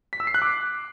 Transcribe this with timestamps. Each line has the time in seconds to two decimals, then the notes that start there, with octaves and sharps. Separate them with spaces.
0.13 B6
0.20 E6
0.27 C7
0.34 F#6
0.42 D6